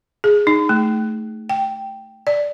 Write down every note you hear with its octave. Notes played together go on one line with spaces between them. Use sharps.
G#4
D#4
A3
G5
D5